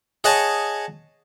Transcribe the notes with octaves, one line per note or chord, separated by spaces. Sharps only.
G#4 C#5 D#5 F#5 G#5 A5